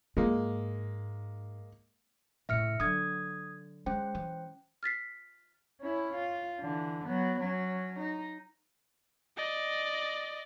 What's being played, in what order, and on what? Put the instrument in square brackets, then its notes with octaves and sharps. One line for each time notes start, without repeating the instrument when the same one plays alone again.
[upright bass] G#2 [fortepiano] G#3 A#3
[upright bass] A2 C#3 [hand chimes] E5 F6 C#7
[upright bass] D3 F#3 [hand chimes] D#6 G#6
[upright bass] G#3 [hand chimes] C#4 C5 G5
[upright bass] E3
[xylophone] F6 A6 B6 C7
[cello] C#4 E4
F4
D3 E3
F#3 B3
F#3 C#4
D#4
[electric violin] D5 D#5